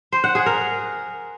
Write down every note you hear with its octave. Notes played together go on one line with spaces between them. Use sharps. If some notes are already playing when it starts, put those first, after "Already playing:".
C5
F#5
G#4
A#4